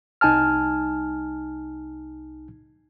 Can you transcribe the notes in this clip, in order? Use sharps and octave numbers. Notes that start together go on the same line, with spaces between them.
C2 D#4 G#5 A5 F6